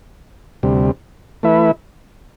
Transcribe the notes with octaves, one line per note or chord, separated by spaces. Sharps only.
D2 C3 G3
E3 A3 E4 B4 E5